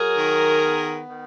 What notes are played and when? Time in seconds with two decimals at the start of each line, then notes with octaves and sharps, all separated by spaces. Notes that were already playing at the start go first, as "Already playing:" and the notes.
Already playing: F#3 G#4 A#4
0.18 D#3
0.63 B3
1.08 D#3